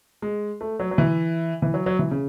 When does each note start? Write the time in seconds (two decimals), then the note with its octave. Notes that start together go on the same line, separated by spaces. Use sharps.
0.22 G#3
0.61 A3
0.80 F#3
0.91 F#3
0.98 E3
1.62 E3
1.74 F#3
1.86 F#3
1.99 E3
2.11 C#3